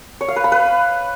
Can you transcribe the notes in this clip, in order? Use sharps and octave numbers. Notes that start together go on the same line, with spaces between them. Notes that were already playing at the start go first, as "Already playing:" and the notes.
C#5
F5
B4
B5
B4